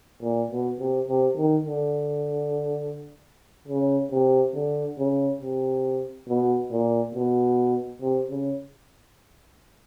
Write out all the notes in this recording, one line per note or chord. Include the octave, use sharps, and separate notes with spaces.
A#2
B2
C3
C3
D#3
D3
C#3
C3
D3
C#3
C3
B2
A#2
B2
C3
C#3